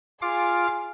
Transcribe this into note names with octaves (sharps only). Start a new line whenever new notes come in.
F4 G#4 F5 D6